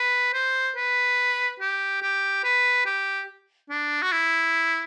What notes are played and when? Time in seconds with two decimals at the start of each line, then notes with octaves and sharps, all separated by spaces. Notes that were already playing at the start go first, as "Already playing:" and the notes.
Already playing: B4
0.34 C5
0.76 B4
1.60 G4
2.02 G4
2.44 B4
2.86 G4
3.70 D4
4.02 F#4
4.12 E4